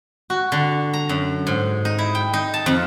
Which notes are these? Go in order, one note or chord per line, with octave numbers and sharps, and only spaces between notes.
F#4
D3
A#5
F#2
G#2
D#4
E4
G5
D#4
A5
F2